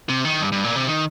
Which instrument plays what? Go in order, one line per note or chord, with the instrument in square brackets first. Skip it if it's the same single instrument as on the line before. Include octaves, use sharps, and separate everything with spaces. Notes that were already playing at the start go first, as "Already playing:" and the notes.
[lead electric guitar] C3
D#3
G2
G2
A#2
C3
D#3